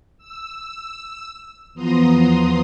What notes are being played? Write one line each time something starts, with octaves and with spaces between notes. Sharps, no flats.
E6
E2 F3 B3 A#5 C6 D#6